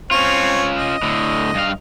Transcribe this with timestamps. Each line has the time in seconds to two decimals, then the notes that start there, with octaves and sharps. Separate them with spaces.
0.11 C4 C#4 F4 C#5
0.78 D#5
1.03 A2 D3
1.55 G2 F5